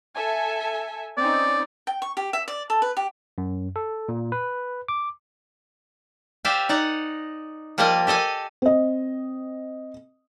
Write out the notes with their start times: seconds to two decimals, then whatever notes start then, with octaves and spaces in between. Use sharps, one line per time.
0.16 A4 E5 G#5
1.17 C4 C#4 D#4 D5
1.87 G5
2.02 C#6
2.17 G4
2.33 E5
2.48 D5
2.70 A4
2.82 B4
2.97 G4
3.38 F#2
3.76 A4
4.09 A#2
4.32 B4
4.88 D6
6.45 G4 C5 D5 E5 F5 G#5
6.69 D#4 D5 F#5 A#5
7.78 F3 G3 A#3 A#4 D5 D#5
8.07 G4 A4 D#5 G#5
8.62 C4 D#5